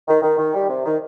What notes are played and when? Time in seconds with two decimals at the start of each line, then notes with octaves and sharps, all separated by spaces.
0.08 D#3
0.22 D#3
0.38 D#3
0.54 G3
0.69 C3
0.85 D#3